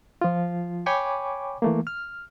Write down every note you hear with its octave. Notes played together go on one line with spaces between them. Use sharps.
F3 F4
C#5 G5 G#5 B5 C#6 D6
E3 A3 A#3
F6